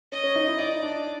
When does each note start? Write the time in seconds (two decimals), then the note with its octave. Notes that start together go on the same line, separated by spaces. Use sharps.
0.12 C#4 D#5
0.24 C#4
0.35 D#4
0.48 E4
0.59 D#4 D5
0.83 D4